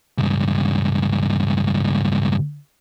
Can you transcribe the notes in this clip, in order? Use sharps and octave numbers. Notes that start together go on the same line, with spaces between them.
C#2 G2